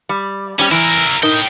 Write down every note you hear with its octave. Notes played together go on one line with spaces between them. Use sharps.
G3
G3 C4 C#4 G4
E3 E4 A#4
A2 D#4 A#4 G5